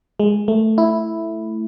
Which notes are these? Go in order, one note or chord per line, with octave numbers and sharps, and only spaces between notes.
G#3
A3
E4